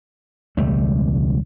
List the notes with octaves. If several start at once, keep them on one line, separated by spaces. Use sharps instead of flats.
E1 C#2 G3 A3